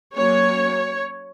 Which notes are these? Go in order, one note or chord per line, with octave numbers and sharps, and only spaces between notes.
F#3 A#3 C#4 C#5